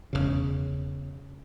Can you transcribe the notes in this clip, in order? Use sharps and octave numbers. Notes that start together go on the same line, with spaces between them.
E1 A#1 C#3